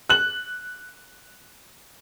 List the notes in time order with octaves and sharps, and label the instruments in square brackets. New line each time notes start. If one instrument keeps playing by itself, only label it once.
[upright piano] F#6 F#7